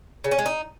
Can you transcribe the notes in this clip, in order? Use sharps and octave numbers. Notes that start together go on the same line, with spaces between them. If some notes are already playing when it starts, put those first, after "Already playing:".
C#3
C#4
G#3
D#4